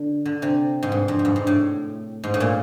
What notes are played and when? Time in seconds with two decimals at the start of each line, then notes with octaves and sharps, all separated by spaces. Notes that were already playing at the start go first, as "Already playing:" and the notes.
Already playing: D3
0.25 D3
0.42 C3
0.83 G#2
0.92 G2
1.08 F2
1.19 G#2
1.25 G2
1.36 G#2
1.47 A2
2.24 G#2
2.34 A2
2.40 A#2